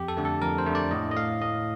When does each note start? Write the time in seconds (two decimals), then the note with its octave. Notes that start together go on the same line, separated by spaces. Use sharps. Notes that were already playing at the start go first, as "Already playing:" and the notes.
Already playing: F2 G4
0.08 A4
0.17 D3 A3
0.25 A4
0.42 F2 A#4
0.58 C5
0.66 D3 A3
0.75 D5
0.91 A2 D#5
1.11 D#5
1.17 A3 F5
1.41 A2 D#5